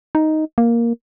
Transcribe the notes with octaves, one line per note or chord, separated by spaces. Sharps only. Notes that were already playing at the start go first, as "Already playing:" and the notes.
D#4
A#3